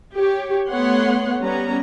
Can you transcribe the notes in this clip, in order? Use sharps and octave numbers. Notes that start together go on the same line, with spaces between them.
G4 C#5
A3 B3 C#5 F#5 C6
G3 B3 C#4 A#5